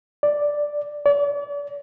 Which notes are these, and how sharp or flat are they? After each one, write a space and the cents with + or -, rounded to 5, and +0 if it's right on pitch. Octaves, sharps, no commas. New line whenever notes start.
D5 +0
D5 -40